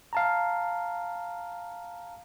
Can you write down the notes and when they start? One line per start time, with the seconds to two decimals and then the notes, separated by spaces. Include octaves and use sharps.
0.13 F5 A5 A#5